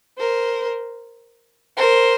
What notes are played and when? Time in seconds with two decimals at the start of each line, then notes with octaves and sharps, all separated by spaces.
0.18 A#4 C5
1.77 A#4 C5